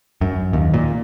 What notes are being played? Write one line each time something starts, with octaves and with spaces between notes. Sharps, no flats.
F#2
D#2
A#2